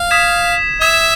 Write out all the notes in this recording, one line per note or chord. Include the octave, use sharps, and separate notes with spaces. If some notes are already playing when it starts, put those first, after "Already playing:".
Already playing: F5
D#6 G#6 B6 E7
E5 D#6 G#6 B6 E7